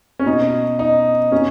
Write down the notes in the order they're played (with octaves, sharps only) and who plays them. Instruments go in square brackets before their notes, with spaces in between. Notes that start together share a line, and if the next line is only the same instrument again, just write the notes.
[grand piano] C#4
B2 D#4
D#4
B2 C#4